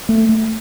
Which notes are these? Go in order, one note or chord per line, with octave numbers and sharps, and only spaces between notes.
A3
A3